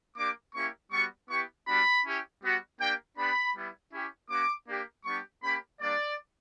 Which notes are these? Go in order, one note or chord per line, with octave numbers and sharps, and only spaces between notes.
A#3 D4 G4 D6
A#3 C#4 E4 G4 C#6
G3 B3 F#4 C#6
B3 E4 G4 C#6
G3 B3 D4 F#4 B5
C#4 E4 G4
G3 B3 F#4
A#3 D4 G4 G5
B3 D4 G4 B5
G3 B3 E4
C#4 E4 G4
A#3 C#4 F#4 D6
A#3 D4 G4
G3 B3 D4 G4 C#6
A#3 C#4 G4 B5
G3 A#3 D4 D5